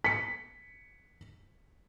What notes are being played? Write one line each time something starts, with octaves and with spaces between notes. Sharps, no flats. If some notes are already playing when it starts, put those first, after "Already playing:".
B6 C#7